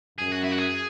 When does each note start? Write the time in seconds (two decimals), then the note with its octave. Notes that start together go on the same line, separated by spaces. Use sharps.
0.18 F#2 G#4
0.32 F#4
0.44 E4
0.51 F#4
0.58 G#4